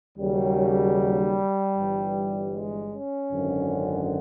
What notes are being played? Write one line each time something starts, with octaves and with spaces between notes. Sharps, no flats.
D#2 C#3 F#3 G3
G1 G2 E3
G#3
C#4
G#1 F#2 D3 F#3